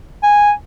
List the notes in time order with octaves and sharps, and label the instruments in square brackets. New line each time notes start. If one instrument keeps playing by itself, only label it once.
[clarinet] G#5